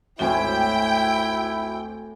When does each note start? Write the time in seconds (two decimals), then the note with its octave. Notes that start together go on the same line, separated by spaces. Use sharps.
0.19 G#1 D2 A2 E4 G5 G#5 G7